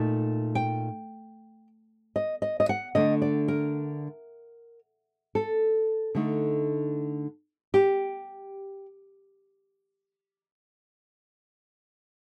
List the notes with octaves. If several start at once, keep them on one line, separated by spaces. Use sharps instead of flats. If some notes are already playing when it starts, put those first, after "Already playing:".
Already playing: A#2 A3 D#4 A5
G5
D#5
D#5
D#5
F#5
D3 A3 D4 D#5
D5
A#4
A4
D3 A3 D#4
G4